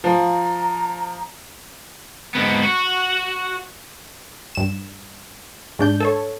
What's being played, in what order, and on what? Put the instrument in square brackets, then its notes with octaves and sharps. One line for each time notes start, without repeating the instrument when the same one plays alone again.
[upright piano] F3 [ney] A#5
[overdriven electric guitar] G#2 B3
F#4
[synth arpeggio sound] G2 E7
G#2 D4 G6
A4 C#5